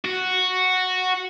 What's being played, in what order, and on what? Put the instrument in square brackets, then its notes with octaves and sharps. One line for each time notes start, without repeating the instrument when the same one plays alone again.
[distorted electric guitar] F#4